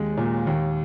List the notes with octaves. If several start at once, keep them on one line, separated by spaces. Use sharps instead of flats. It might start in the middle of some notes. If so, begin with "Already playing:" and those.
Already playing: D#2 G#3
A#2
D#2